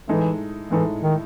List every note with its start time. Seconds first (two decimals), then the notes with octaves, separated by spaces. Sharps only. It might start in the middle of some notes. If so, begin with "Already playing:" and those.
0.08 A2 E3 G#3 D#4 A4
0.71 A2 E3 G#3 D#4 A4
1.03 D#3